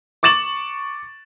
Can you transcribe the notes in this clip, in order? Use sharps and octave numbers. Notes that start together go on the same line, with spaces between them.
C#6 D6 A6 E7 F#7